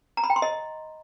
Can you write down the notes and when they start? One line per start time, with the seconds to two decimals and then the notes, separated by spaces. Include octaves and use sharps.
0.17 A#5
0.24 B5
0.30 G5
0.36 C6
0.42 D#5